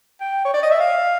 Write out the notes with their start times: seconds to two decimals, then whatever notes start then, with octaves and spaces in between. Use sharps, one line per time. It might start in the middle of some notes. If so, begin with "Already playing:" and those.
0.21 G5
0.45 C#5
0.54 D5
0.63 D#5
0.71 E5
0.80 F5